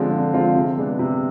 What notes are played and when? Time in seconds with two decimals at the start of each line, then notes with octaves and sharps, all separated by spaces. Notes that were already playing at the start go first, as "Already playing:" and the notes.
Already playing: D3 F3 G#3 C4 F4
0.11 D3
0.34 F3 G#3 C4 F4
0.55 C3
0.77 G#3 B3 D4
0.99 C3